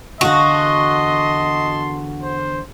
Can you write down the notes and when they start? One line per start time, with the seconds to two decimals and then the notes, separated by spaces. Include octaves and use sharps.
0.21 E2 D3 F#4 D#5 F5 A5 C6
2.23 C5